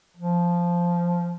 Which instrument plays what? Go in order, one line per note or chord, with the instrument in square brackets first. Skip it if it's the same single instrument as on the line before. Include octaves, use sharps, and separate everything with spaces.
[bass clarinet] F3